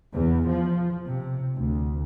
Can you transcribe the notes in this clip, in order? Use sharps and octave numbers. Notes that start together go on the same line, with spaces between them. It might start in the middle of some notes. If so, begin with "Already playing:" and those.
E2
F3
C3
D2